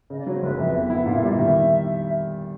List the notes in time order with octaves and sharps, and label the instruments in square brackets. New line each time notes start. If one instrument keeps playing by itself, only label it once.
[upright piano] C#3 [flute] D#5
[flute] D5
[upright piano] F#3 [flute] C#5
[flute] C5
[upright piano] F#1 [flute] B4
[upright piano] F2 [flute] E5
[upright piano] B3 [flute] E5
[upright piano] E4 [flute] F#5
[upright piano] A#2 [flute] F5
[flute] E5
[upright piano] G3 [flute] D5
[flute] D#5
[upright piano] D#3 [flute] E5